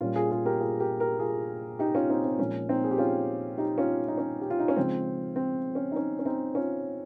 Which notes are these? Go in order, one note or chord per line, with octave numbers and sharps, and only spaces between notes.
A#2 G3 C#4 F4
F4 G#4
F4 G#4
G4 A#4
F4 G#4
G4 A#4
G4 A#4
F4 G#4
D#4 G4
C#4 F4
C4 D#4
C4
A#2 F3 G#3 C#4
C4 D#4
G#4
G4
C#4 F4
D#4 G4
C#4 F4
D#4
C#4
G4
F4
D#4
C#4
C#3 F3 G#3 C4
C4
C#4
D#4
C#4
C#4
C4 D#4
C#4 F4